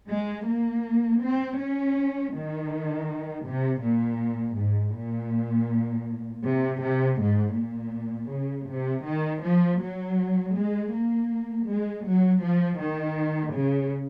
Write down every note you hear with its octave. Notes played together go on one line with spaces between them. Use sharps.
G#3
A#3
C4
C#4
D#3
C3
A#2
G#2
A#2
C3
C3
G#2
A#2
C#3
C3
D#3
F3
F#3
G#3
A#3
G#3
F#3
F3
D#3
C#3